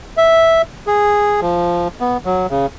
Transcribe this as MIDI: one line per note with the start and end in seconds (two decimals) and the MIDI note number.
0.17 0.62 76
0.87 1.40 68
1.41 1.88 53
2.01 2.18 59
2.25 2.47 54
2.50 2.66 49